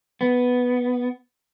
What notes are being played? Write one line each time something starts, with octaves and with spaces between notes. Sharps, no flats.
B3